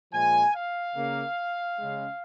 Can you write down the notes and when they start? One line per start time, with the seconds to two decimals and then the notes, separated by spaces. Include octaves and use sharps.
0.13 A#2 F3 G#3 G#5
0.54 F5
0.96 C#3 A#3
1.79 C#3 G#3